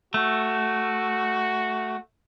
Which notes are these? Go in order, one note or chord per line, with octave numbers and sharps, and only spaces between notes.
A3 F#4